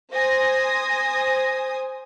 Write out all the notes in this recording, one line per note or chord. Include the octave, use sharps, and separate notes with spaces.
C5 G#5 D#6 A#6